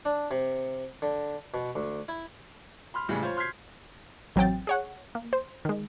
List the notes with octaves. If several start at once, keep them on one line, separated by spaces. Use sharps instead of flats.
D4
C3
D3
B2
D2
E4
B5 C6 F6
A2 C#3 E3 G3 G#3
F4 C5 C#5
C6 F6 G6 G#6 B6 C7
A1 F#3 C4 G5 A6
G#4 C#5 F#5
A#3
C5
D#3 G#3